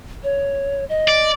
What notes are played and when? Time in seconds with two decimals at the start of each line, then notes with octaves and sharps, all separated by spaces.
0.23 C#5
0.89 D#5
1.08 D5